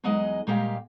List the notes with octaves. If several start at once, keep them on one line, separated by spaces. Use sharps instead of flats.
E2 F#3 G#3 D#4 G#4 D#5
A#2 G3 G#3 A#3 G4 F5